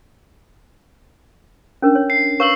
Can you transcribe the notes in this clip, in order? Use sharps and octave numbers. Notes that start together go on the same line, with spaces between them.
C#4 D4 A#4
C#5
C7
B4 C#5 F5 C#6 E6 F#7